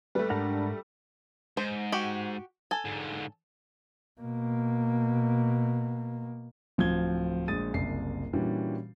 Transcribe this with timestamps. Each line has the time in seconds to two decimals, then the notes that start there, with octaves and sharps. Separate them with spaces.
0.15 G3 A3 B4
0.30 G#2 D4 A#4 F#5
1.57 G#2 C5
1.92 F#4 G4
2.71 A4 G#5
2.85 G#2 D3
4.21 B2 A#3
6.78 D1 F3 C4 F4 G#6 G7
7.48 A#1 G#3 D#6 A6 D#7
7.74 F#1 C2 C7
8.33 A#2 E3 G3 C#4 D4 F#4